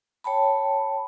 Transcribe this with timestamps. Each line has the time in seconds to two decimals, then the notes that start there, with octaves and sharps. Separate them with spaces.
0.24 C#5 G5 A5 B5